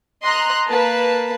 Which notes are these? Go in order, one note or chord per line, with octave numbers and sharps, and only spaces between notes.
D#5 A#5 C6 F#6
A#3 B4 A5